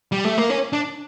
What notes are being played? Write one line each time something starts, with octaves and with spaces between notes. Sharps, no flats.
G3
A3
A#3
C#4
D4